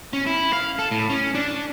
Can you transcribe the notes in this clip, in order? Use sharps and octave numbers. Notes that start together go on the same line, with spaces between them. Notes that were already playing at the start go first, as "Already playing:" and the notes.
C#4
E4
F5
A4
A2
C#4
D4